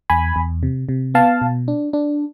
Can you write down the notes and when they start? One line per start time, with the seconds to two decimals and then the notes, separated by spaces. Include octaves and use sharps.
0.10 E2 G#5 B5
0.36 E2
0.63 C3
0.89 C3
1.14 B3 F5 A5
1.41 B2
1.68 D4
1.93 D4